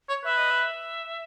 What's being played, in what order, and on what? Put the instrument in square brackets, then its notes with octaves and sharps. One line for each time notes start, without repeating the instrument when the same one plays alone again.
[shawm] C#5
[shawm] B4 [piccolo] E5
[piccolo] D#5
E5